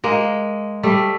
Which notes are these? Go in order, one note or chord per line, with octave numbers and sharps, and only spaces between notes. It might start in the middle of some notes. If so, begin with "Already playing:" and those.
G#3 A#3
G3 A3